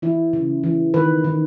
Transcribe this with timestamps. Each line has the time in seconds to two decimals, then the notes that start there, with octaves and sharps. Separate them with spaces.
0.02 E3 E4
0.33 C#3
0.64 E3
0.94 D#3 B4
1.24 D#3